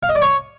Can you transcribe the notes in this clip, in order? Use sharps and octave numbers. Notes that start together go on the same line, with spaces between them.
F5
D#5
D5
C#5